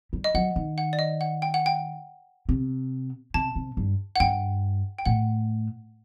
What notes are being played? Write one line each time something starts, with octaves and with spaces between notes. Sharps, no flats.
G3
D#5
F#3 F#5
D#3
F#5
D5
D#5
F#5
G5
F#5
G5
C3
C3 A5
C3
G2
F#5
G2 G5
G5
A2 F#5